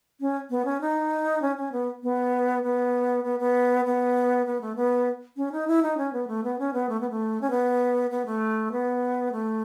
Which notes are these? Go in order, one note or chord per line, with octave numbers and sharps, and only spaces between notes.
C#4
B3
C#4
D#4
C#4
C#4
B3
B3
B3
B3
B3
B3
B3
A3
B3
C#4
D#4
E4
D#4
C#4
B3
A3
B3
C#4
B3
A3
B3
A3
C#4
B3
B3
A3
B3
A3